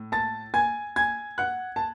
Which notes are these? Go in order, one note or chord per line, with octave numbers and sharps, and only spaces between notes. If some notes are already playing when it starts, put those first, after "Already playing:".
Already playing: A2
A5 A6
G#5 G#6
G#5 G#6
F#5 F#6
A5